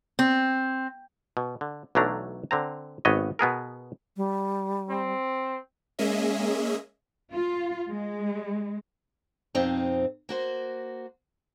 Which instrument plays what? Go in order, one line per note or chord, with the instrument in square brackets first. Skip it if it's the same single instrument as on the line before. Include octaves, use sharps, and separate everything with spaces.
[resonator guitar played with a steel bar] C4
[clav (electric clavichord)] B2
D3
B1 E3 F#3 A3 D4 A#5
D3 C4 A#5
G#1 B3 C#5 D#5
B2 B3 G#4 A#4
[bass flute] G3
[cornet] C4
[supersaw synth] G#3 A#3 C#4 G#4 D#5 E5
[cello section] F4
G#3
[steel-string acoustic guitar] F2 B2 C4 D#4
A#3 F#4 C5